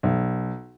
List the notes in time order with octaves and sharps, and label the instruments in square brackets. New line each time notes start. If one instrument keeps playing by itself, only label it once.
[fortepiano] B1